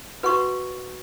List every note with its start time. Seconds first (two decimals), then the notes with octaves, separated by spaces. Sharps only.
0.23 F#4 B4 F#5 C#6